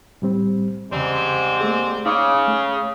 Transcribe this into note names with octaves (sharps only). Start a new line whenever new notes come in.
A2 G3 C4
E2 G#2 C#3 G3 C4
A3 A#3 G#4
C#3 D#4 F5 D6
A3